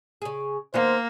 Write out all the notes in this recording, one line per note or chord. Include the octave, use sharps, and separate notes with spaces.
C#3 G#4
D#3 A#3 B3 F4 C5